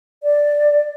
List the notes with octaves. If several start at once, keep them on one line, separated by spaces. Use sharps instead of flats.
D5